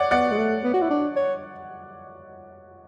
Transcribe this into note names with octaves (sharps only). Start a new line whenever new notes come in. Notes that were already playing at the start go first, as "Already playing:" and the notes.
Already playing: C#5 D5 F#5
B3 D5 F#5
G#3
A3
B3
F#4
E4
D4
C#5